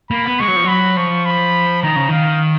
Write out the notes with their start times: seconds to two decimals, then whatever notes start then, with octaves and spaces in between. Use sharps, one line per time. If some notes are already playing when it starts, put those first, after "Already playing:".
0.10 A#3 B5
0.25 B3
0.40 G#3 C#6
0.48 F#3
0.56 F3
0.64 F#3 B5
0.97 F3 C#6
1.26 B5
1.83 D#3 A#5
1.96 C#3
2.08 D#3 F5